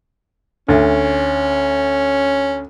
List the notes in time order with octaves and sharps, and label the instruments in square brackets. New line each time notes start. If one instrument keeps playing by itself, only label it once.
[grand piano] D2 [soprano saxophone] C#4